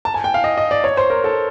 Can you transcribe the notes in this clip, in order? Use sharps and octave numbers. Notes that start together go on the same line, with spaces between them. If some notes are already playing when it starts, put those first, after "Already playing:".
A5
G#5
G5
F5
D#5
D#5
D5
C#5
C5
A#4
A4